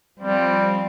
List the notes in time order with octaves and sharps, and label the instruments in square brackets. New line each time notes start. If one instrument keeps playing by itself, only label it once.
[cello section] F3 C4 [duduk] G3